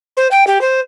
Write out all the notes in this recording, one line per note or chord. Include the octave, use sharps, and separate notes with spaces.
C5
G5
G4
C5